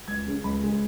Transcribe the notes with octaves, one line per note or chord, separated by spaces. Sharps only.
C#2 G#6
C#3 G#3 C#4
C#2 B5
C#3 G#3 C#4